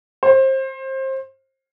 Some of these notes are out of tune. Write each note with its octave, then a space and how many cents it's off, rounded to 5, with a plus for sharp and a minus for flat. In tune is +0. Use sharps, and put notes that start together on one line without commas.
C5 +25